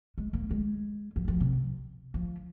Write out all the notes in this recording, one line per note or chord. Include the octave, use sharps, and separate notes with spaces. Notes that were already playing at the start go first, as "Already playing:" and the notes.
G#3
A#3
G#3
F3
F3
C3
F3